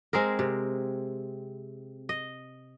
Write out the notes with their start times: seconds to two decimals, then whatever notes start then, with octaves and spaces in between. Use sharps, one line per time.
0.13 G#3 C4 G#4 A#4
0.39 C3
2.09 D#5